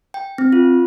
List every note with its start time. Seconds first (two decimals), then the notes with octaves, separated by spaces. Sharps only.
0.14 G5
0.38 C4
0.53 F4